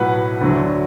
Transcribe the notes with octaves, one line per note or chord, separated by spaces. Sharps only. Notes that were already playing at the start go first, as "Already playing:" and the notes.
Already playing: B1 A2 F#3 B4 F#5
D2 D3 F#3